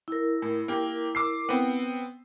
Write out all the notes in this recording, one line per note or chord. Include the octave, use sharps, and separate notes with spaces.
E4 A#4
A2
A#3 G4
D6 E6 C7
B3 C4